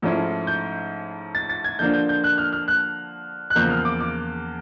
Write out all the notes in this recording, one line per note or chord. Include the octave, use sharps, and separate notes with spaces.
G#2 F3 A3 C#4 E4
G6
A6
A6
G#6
D3 F3 A#3 D4 G6
G6
G6
F#6
F6
F6
F#6
F#6
E2 C#3 F3 A#3 G6
F6
D6
D6